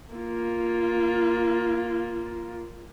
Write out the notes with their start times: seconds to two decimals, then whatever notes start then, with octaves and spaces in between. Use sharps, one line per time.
0.14 A#3 F4